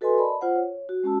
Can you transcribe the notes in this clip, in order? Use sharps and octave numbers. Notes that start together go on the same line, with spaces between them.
F#4 A4 B4 D#5 G#5 C6
A#4 D5 D#5 A5 B5
F4 C5 F#5
C#5
F#4
G#3 C#4 F#4 A5 E6